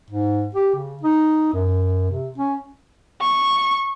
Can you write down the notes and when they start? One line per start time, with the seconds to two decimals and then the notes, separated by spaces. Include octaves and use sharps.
0.10 G#2
0.55 G4
0.75 C#3
1.03 D#4
1.53 F#2
2.10 C3
2.38 C#4
3.21 C#6